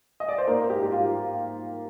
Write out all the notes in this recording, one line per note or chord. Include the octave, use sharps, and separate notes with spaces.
D#5
D5
C5
G#2 A#3 A#4
G#2
G4
G#2 G4
F4